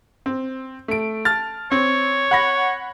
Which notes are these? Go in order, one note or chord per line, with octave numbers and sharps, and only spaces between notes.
C4
A3 D7
A5 F6 A6
C4 C#5
F#5 B5 A#6